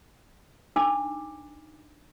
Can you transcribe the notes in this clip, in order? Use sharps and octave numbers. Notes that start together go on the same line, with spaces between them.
D4 D#4 D6 E6